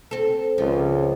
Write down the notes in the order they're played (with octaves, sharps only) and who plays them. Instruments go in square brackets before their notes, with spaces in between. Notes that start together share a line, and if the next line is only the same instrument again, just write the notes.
[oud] C4 A4
[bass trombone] C#2 [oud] F3